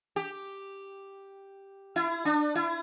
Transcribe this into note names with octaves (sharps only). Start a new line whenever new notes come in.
G4
E4
D4
E4